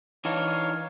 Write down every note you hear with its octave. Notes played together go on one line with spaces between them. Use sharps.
E3 D4 D#4 C#5 F5